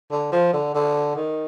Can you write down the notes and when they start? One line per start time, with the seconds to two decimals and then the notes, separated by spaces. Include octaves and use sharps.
0.11 D3
0.32 F3
0.53 D3
0.74 D3
1.15 D#3